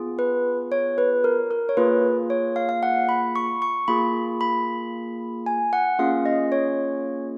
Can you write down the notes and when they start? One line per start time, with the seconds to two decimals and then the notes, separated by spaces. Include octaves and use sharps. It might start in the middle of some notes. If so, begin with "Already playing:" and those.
Already playing: B3 F4 G#4
0.19 B4
0.72 C#5
0.98 B4
1.24 A#4
1.51 A#4
1.69 C#5
1.77 A#3 F4 G#4 B4
2.30 C#5
2.56 F5
2.69 F5
2.83 F#5
3.09 B5
3.36 C#6
3.62 C#6
3.88 A#3 F4 G#4 B5
4.41 B5
5.46 G#5
5.73 F#5
5.99 A#3 C#4 F4 G#4 F5
6.26 D#5
6.52 C#5